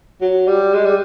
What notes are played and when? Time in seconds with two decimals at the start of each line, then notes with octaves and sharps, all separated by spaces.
0.21 F#3
0.47 G3
0.75 G#3
0.85 G3